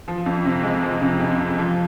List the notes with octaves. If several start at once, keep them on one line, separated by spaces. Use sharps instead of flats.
F3
F2
C3
G#3
F3
C3
F2
F3
F3